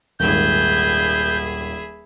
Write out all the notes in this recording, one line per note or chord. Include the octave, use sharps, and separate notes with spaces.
D#1 G#1 G#4 E5 B5 G6